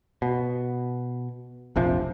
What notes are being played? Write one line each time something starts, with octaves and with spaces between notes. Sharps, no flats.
B2
F1 A#1 C3 F3